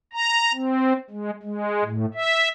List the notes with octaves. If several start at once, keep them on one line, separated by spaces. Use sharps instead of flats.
A#5
C4
G#3
G#3
A2
E5